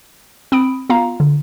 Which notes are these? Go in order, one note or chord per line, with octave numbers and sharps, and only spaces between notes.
C4 B5 D#6 D7
B3 F4 F5 A#5
D3